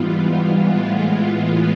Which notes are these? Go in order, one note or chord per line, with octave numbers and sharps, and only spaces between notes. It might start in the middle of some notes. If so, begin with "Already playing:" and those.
Already playing: G#2 E3 G3 B3 F4
A2 E3 G#3 B3 F4